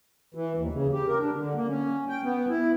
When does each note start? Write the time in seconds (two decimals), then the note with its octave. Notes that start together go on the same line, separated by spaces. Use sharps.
0.35 E3
0.57 D#2
0.73 C#3
0.93 G4
1.07 A#4
1.20 D4
1.36 D3
1.56 A#3
1.68 C#4
2.09 G5
2.24 B3
2.49 E4